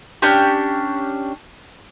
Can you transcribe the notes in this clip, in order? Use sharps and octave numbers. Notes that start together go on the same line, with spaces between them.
C#4 D4 G4